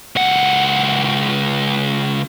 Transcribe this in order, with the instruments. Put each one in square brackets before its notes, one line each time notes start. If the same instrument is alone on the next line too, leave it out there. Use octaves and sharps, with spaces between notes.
[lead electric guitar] C#2 F#5